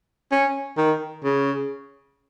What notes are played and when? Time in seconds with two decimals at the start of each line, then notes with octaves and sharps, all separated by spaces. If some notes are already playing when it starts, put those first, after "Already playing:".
0.32 C#4
0.77 D#3
1.24 C#3